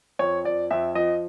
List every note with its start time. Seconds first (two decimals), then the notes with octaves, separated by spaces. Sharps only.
0.19 F2 C#5
0.45 F2 D5
0.71 F2 E5
0.95 F3 D#5